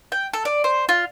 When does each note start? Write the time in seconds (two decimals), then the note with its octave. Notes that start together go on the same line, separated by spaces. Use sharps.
0.12 G5
0.33 A4
0.45 D5
0.64 C5
0.89 F4